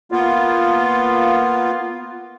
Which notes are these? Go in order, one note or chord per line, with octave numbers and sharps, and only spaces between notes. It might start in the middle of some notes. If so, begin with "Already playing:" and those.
A#3 B3 F4